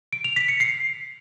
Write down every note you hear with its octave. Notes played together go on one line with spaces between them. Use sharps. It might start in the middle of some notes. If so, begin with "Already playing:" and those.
D7
F7
B6
C#7
C7